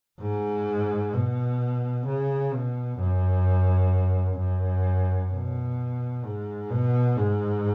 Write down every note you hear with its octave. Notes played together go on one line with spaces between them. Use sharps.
G#2
B2
C#3
B2
F#2
F#2
B2
G#2
B2
G#2